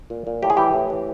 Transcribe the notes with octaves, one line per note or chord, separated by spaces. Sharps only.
A#2
A#2
A2 G4
G#4
E3 G4
A2
E3